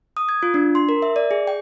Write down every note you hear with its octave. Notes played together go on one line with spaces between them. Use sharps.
D#6
G#6
F4
D4
C6
A#4
E5
D5
G#4
G5